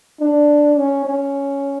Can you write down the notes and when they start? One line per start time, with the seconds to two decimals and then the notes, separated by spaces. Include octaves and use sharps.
0.20 D4
0.78 C#4
1.06 C#4